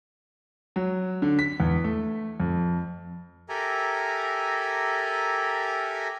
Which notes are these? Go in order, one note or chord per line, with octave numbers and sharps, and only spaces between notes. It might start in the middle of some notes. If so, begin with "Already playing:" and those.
F#3
D3
B6
E2
A3
F2
G4 A4 A#4 E5 G#5 A#5